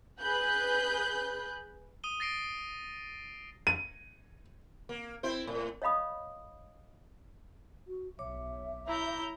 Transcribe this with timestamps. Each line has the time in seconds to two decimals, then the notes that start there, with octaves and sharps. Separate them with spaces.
0.20 G#4 B4 B5 F#6 G6
2.04 D#6 D#7 G7
2.20 A6 A#6 C7 D7
3.67 D#7
4.89 A#3
5.23 C4 E4 C5
5.47 A2
5.82 C#5 D#5 F5 B5 D#6
7.87 F#4
8.19 B1 C#5 E5 D6
8.87 E4 A#5 G6